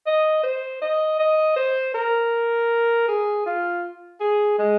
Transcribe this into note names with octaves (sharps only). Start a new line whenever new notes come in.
D#5
C5
D#5
D#5
C5
A#4
G#4
F4
G#4
G#3